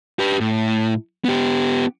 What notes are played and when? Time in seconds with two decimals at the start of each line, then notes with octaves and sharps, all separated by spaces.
0.19 G4 B4
0.40 A2
1.25 B3 G4